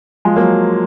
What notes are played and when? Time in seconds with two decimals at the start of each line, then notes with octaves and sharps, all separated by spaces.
0.25 F3 G#3
0.36 F#3 A#3